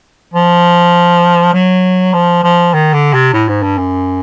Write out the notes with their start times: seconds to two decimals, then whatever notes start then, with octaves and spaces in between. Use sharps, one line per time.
0.33 F3
1.53 F#3
2.13 F3
2.43 F3
2.74 D#3
2.93 D3
3.13 C3
3.33 A2
3.48 G#2
3.62 G2
3.78 F#2